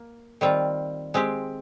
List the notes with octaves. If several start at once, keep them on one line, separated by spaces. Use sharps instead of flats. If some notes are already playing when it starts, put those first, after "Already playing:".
Already playing: A#3
D#3 G3 C4 F4
G#3 C4 G4